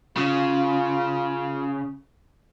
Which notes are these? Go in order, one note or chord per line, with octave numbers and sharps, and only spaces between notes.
C#3 F4